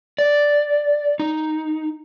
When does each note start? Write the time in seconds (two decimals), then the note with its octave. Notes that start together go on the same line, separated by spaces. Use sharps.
0.18 D5
1.19 D#4